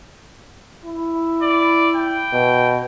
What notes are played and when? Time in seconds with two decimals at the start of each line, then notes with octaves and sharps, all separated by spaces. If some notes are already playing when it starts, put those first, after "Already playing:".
0.85 E4
1.42 D5
1.96 G5
2.33 B2